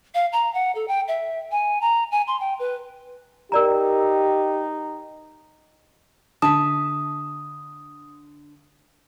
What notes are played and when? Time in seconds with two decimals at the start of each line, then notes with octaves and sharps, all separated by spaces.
0.14 F5
0.33 A#5
0.54 F#5
0.75 A4
0.88 G5
1.08 E5
1.51 G#5
1.81 A#5
2.12 G#5
2.27 C6
2.40 G5
2.59 B4
3.52 D#4 G4 A#4 D5 A#5
6.42 D3 E5 A5 D#6